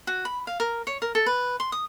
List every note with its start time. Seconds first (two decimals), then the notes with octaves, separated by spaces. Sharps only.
0.07 F#4
0.25 B5
0.47 F5
0.60 A#4
0.87 C#5
1.02 A#4
1.15 A4
1.26 B4
1.60 C6
1.72 D#6